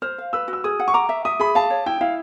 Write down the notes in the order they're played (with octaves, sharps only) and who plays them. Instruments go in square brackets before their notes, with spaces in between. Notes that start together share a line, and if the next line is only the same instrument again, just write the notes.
[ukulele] C5 [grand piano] F6
[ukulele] F5
[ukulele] B4 [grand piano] E6
[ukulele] F#4
[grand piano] E6
[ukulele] G#4 [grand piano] D#6
[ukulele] F#5
[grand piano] C#6
[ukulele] A#5 [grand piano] D6
[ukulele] E5
[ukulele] E5 [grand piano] D#6
[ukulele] G#4 [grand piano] B5
[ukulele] F5 [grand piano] A5
[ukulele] C#5
[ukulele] E4 [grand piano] G5
[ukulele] E4 [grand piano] F5